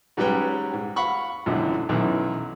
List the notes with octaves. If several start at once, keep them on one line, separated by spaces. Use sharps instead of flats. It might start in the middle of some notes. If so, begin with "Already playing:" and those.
G#2 F#3 G3 C#4 B4 G5
G#2
F5 F#5 B5 C#6
G#1 F#2 B2 D3 E3
B1 F#2 D#3 E3 B3